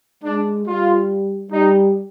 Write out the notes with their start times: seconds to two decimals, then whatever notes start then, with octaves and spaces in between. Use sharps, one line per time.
0.23 G#3 D4
0.66 G3 F4
1.51 G3 D#4